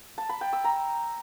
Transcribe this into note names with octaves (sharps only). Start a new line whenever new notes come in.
A5
B5
G5
E6
A#5